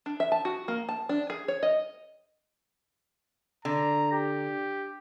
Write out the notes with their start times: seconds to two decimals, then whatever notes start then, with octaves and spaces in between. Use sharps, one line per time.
0.06 D4
0.20 E5
0.32 A5
0.45 F#4
0.68 A#3
0.89 A5
1.09 D4
1.30 G#4
1.48 C#5
1.63 D#5
3.65 D3 A#5
4.12 G4